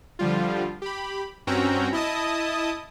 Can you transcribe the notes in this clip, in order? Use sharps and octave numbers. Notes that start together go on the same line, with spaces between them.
D3 F3 G3 F4
G4 B5
G2 C4 C#4 F#4 G5 A#5
E4 D#5 A5 D#6